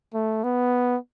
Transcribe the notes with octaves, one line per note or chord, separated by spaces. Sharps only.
A3
B3